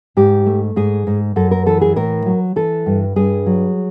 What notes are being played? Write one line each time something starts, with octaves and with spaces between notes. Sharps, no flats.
G#2 G4
A3
G#2 G#4
G#2
F#2 A4
A#4
E3 A4
G#4
A2 A#4
F#3
E3 A4
G2
G2 G#4
F#3